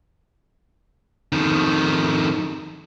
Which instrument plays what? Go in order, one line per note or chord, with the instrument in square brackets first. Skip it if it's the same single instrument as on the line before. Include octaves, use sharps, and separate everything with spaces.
[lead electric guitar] F2 D#3